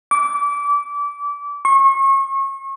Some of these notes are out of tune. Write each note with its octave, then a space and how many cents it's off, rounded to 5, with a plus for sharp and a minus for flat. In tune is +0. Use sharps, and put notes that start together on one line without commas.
D6 -25
C#6 -35